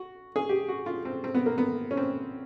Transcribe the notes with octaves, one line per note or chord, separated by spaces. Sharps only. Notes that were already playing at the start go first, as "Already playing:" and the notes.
Already playing: F#4
G#4
G4
F#4
F4
C4
C4
B3
A#3
B3
C#4
C4